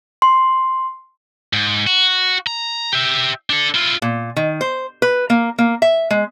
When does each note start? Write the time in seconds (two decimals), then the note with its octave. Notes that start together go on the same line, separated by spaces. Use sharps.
0.22 C6
1.53 G#2
1.87 F#4
2.47 A#5
2.93 G4 E5
3.50 D4 A4
3.75 E4 F4
4.02 A#2
4.36 D#3
4.61 C5
5.02 B4
5.30 A#3
5.58 A#3
5.82 E5
6.10 G#3